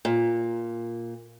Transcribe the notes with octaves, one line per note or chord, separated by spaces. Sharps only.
A#2